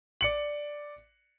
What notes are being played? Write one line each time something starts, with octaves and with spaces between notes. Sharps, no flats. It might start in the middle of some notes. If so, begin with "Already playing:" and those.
D5 C#7 F#7